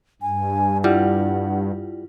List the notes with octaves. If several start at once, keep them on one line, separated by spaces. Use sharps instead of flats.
G2 G#5
G3 E4 F4 F#5